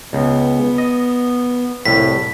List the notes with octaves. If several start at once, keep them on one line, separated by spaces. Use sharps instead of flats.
C#2 B3
D#5
C2 A2 B6